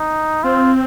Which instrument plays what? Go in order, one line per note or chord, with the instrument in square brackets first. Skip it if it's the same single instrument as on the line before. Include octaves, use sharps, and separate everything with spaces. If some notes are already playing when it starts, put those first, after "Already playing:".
Already playing: [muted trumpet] D#4
[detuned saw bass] C4 [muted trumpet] F4